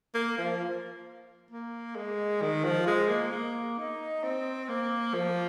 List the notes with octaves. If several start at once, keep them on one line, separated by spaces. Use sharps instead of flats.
A#3
F3
A#3
G#3
D#3
F3
G#3
A#3
A#3
D#4
C4
A#3
F3